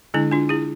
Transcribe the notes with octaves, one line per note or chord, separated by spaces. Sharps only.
D3 G#3 D4 E4
D4 F4
E4 G#4